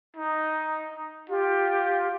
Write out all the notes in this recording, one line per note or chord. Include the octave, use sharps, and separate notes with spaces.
D#4
F4 G4